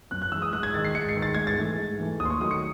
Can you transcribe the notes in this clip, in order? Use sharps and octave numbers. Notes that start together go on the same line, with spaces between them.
F#2 F#6
F#6
E3 G#3 E6
D#6
G#2 F#6
G#6
D#3 G#3 A6
C7
G#2 C#7
C7
D#3 G#3
A6
G#2 G#6
A6
E3 A3
G#2
E3 A3
D#2 D#6
C6
C#6
D#3 F#3 A3 D#6
C#7